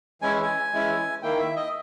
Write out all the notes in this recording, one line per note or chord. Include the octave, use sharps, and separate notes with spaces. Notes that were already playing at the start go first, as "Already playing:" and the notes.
E3 G#3 C#4 E4 G#5
G#5
E3 G#3 C#4 E4
D#3 A#3 E4 G5
E5
D#5